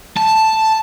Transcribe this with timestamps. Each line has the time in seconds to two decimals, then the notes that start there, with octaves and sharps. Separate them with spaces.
0.17 A5